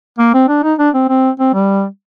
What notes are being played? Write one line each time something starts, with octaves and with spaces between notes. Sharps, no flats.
A#3
C4
D4
D#4
D4
C4
C4
C4
G3